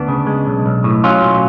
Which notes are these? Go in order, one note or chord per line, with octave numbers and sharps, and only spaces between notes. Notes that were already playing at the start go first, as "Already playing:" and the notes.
Already playing: D2 B3 D4
C#3
G#3
B1
B1
A2
F#3 C#4 F4
B1